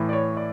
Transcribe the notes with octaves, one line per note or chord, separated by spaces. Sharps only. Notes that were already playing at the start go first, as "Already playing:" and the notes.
Already playing: A2 E3
D5
C#5
D5